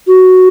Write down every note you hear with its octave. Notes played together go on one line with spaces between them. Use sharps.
F#4